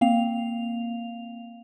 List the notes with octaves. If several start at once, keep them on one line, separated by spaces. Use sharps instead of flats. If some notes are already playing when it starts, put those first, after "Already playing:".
A#3 C4 F5 F7